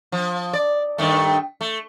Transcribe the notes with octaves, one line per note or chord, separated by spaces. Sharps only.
F3
D5
G2 D#3 A3
A3